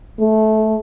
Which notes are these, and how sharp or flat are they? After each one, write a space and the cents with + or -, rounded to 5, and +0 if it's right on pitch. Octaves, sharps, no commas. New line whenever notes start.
A3 -15